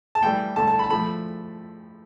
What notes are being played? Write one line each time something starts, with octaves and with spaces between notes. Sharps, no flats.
A5
A2 E3 G3 G5
G2 D3 A3 A5
A5
B5
A5
A2 F3 A3 B5